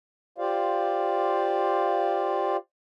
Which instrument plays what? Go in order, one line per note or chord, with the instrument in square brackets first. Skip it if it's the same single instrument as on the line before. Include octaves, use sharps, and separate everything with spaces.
[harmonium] F4 G4 C5 D5 F5